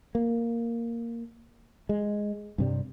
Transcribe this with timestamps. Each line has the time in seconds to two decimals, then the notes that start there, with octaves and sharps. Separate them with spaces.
0.15 A#3
1.89 G#3
2.58 G2 C3 G3